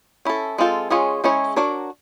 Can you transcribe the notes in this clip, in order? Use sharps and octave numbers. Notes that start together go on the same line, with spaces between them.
C#4 E4 A4
G#3 C4 F4 A4
G#3 C#4 F4 G#4 C#5
G#3 C#4 E4 G#4 C#5
D4 F#4 A#4 C#5